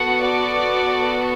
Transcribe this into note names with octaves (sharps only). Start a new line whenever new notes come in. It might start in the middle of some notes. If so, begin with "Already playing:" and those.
Already playing: B3 F#4 A4 F#5
D5